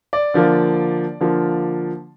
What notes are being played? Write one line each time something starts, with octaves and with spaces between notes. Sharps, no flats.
D5
D3 F3 A#3
D3 F3 A#3